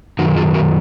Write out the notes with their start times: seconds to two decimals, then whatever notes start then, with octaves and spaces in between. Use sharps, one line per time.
0.19 F#2 D#3 F#3 D#4 F#4
0.36 F4 G#4
0.54 F#4 A#4